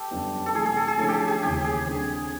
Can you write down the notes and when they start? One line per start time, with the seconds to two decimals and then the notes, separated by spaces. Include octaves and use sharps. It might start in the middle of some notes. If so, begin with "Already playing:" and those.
Already playing: G4 A4
0.11 F#2 D3 G3 B3 D4
0.46 A4
0.55 C3 E3 A3 G#4
0.66 G#4
0.77 A4
0.88 G#4
0.98 D3 F3 A3 C#4 E4 A4
1.08 G4 G#4
1.28 G#4
1.42 D#2 C#3 E3 G4
1.64 G#4
1.86 D3 G3 C4